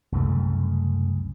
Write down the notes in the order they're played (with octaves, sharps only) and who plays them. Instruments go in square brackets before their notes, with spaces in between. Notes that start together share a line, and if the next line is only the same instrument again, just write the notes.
[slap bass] C2 F#2 C#3 A3